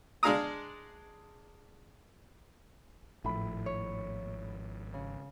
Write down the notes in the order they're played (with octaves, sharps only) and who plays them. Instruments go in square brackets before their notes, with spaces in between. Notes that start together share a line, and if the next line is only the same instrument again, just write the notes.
[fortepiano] G#3 D4 G#4 F5 A#5 D#6
[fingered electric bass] G#1 F3 [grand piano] A2 B5
[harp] C#5
C#3